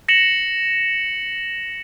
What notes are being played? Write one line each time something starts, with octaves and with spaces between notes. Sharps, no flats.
A#6 C#7 E7 F#7